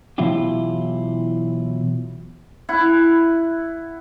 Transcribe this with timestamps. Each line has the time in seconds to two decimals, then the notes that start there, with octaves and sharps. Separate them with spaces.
0.18 B2 E3 F#3 E4 F4 G4
2.69 E4 F#5